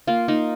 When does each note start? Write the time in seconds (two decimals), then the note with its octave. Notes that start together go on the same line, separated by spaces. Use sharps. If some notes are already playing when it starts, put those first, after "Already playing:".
0.07 A#3 F4
0.28 A#3 D#4